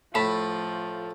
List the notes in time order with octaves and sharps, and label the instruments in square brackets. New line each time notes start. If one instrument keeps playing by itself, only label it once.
[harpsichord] A2 [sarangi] F3 [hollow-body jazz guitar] A5 B5